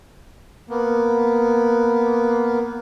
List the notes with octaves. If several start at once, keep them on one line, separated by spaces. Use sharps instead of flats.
A#3 B3